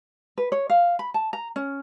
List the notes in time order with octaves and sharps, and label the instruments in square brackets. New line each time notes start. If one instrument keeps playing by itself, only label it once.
[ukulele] B4
C#5
F5
B5
A5
A#5
C#4